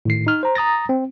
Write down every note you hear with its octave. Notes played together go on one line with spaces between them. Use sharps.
A2 D#3 C7
D#4 F6
C5 A#5
A#5 D#6 A6 A#6
C4